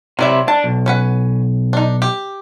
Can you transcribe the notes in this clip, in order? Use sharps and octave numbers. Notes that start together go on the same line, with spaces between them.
C3 F#3 E4 D5 E5
D4 A5
B1
C#4 B4 F#5
D4 D#4
G4